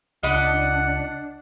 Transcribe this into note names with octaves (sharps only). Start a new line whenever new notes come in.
C#2 D4 D#5 F#5 B5 D6